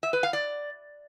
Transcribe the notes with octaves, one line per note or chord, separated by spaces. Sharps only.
E5
B4
F5
D5